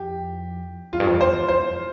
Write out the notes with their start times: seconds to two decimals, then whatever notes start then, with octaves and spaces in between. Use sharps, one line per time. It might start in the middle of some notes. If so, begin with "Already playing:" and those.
Already playing: F2 G4
0.93 F2 F4
1.00 G2
1.07 F2
1.20 E2 C5
1.48 F2 C5